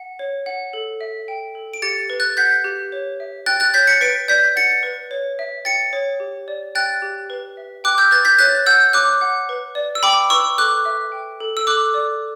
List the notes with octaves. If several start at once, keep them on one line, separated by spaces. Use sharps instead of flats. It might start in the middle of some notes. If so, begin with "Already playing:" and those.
Already playing: F#5
C#5
F#5
A4
E5
G5
A4
D7
G4 A6 C#7
B4
F#6 A6
F#5 G6 B6
G4
C#5
E5
G5 F#6 A6
F#6 A6
C#5 G6 B6
A6 C#7
B4 B6 D7
D5 G6 B6
F#5 A6 C#7
B4
C#5
E5
G5 A6 C#7
C#5
G4
D5
G5 F#6 A6
G4
B4
E5
G5 D6 F#6
E6 G6
B4 F#6 A6
G6 B6
C#5 F#6 A6
F#5 E6 G6
C#5 D6 F#6
F#5
B4
D5
E6
G5 B5 D6
B4 C#6 E6
A4 D6 F#6
E5
G5
A4
E6
A4 D6 F#6
D5